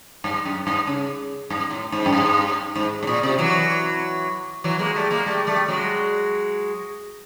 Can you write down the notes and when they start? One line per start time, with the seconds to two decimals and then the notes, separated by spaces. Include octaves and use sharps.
0.24 G2
0.45 F#2
0.67 G2
0.87 C#3
1.50 G2
1.70 A2
1.92 G#2
2.06 F#2
2.13 G2
2.76 G#2
3.03 A2
3.07 A#2
3.23 C3
3.38 E3 F#3
4.64 E3 F#3
4.79 G#3 A#3
4.96 G3 A3
5.11 G#3 A#3
5.26 G3 A3
5.47 G3 A3
5.68 F#3 G#3